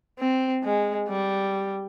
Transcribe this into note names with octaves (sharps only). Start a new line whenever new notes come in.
C4
G#3
G3